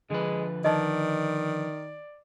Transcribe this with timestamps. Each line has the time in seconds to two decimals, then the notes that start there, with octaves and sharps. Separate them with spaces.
0.10 D3 F3 G#3 B4
0.65 D#3 D5 D#5 A5